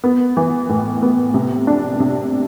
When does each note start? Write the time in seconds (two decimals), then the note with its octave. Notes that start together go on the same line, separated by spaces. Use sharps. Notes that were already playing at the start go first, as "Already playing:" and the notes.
0.04 B3
0.37 E3
0.69 A2
1.02 B3
1.34 C3
1.67 D4
2.00 C3